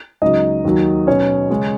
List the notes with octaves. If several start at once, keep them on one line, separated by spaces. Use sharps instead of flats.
C#2 C#3 F#3 D#4 D#5
D#2 D#3 F#3
B2 F#3 C#4 C#5
C#3 G#3 C#4